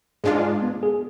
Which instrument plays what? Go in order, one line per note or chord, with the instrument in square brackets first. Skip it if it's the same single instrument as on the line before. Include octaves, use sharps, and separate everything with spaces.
[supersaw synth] G#2 G#3 D4 F4 [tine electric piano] G#4
[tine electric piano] B3
G#4